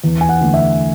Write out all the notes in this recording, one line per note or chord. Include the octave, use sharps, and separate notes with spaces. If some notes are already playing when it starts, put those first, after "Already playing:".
E2
G#5
F#5
D3 A3
E5